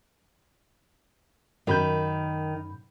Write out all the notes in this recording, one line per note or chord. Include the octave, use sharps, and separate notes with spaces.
F#2 D#3 B5 G6